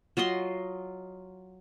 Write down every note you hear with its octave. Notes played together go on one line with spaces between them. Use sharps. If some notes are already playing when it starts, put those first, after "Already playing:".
F#3 F4 D#5 C6